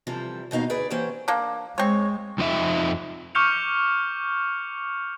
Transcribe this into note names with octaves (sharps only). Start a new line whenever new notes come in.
C3 E3 F3 G3 A4
D#2 B2 D#4 F5
D2 G#4 B4 D5
E3 A#3 C#4 G4 C5 F#5
A#3 D4
G#3 C4 C#5
F2 F3 D#4 E5
C#6 D6 F6 G6 C#7 F7